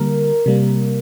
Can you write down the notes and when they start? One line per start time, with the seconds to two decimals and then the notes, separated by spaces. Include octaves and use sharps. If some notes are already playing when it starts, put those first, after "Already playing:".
Already playing: D3 G3 A#3 A#4
0.46 C3 G3 A#3